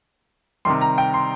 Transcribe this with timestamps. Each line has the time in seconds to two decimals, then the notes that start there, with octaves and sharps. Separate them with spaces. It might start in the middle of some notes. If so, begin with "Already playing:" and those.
0.65 C3 D#3 G3 C6
0.81 A#5
0.98 G5
1.14 C6